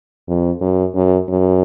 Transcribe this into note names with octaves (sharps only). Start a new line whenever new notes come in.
F2
F#2
F#2
F#2